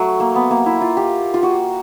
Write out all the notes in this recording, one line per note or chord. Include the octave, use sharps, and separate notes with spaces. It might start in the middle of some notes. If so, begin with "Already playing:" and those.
Already playing: F#3 A3
A#3
B3
A#3
E4
F4
G4
F4
F#4